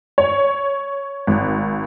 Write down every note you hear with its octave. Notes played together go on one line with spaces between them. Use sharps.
C#5
G#1